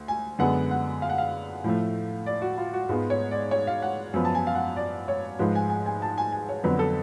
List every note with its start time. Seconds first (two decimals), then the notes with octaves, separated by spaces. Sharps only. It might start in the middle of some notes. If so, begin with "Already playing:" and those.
Already playing: D2
0.08 G#5
0.39 F#2 D3 G#3 B3 F#5
0.71 F#5
1.02 F5
1.09 F#5
1.18 F5
1.64 A2 F3 A3
2.26 D5
2.42 F#4
2.58 F4
2.73 F#4
2.89 G#2 G#3 B3 F4
3.10 C#5
3.31 D5
3.51 C#5
3.67 F5
3.82 F#5
4.13 F#2 F3 B3
4.25 A5
4.35 G#5
4.47 F5
4.55 F#5
4.77 D5
5.08 C#5
5.39 G#2 F3 G#3 B4
5.55 G#5
5.70 G#5
5.86 G#5
6.02 A5
6.18 G#5
6.32 G#5
6.49 C#5
6.64 F2 D3 F#3 B3 B4
6.79 A4